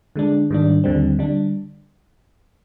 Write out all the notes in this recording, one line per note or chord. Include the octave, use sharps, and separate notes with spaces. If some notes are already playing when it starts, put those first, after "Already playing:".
D3 G#3 D4
G#2 D#3 G3 D4
D#2 D3 G3 C4
D3 G3 D4